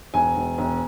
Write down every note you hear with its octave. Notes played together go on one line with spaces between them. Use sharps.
E1 G#5
E1
E1